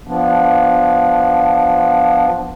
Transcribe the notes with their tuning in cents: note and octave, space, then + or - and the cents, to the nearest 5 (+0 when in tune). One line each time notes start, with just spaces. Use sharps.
F3 +0 B3 +0 D4 +0